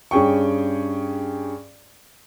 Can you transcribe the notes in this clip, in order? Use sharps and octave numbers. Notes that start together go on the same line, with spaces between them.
G2 C#4 G#4 G5 C#6